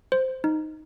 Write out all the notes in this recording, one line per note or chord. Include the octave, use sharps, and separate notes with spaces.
C5
D#4